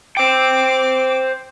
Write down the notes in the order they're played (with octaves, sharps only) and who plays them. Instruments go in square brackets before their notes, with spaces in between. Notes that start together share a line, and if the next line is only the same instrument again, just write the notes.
[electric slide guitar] C5 G5 [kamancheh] D6